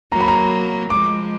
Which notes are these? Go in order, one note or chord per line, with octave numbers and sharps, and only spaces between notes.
F#3 A#3 A#5
B5
A#5
F3 G#3 D6